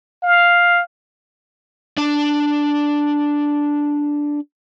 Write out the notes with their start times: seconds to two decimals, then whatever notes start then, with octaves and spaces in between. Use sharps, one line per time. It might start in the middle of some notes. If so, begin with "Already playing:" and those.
0.23 F5
1.97 D4 D5